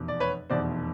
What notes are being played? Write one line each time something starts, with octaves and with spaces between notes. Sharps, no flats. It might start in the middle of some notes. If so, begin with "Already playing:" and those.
Already playing: F1 E2 B2
D5
B4 C#5
F1 E2 B2 C5 D5